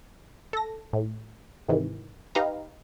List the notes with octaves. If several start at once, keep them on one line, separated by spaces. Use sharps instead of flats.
A4 A#6
A2
G#2 C3 D#3 E3
D#4 G4 B4 F5 A#5